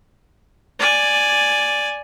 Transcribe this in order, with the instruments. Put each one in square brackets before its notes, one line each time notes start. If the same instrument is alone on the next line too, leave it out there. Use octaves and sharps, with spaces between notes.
[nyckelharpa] D5 G#5